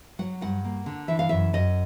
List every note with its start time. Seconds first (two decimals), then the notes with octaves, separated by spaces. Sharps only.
0.19 F#3 F#5
0.41 G2 F#5
0.65 A#3
0.86 D3
1.08 E3 E5
1.19 F5
1.29 F#2 E5
1.53 F#2 D#5